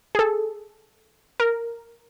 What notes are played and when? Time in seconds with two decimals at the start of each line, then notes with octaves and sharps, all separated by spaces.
0.15 G#4
0.19 A4
1.40 A#4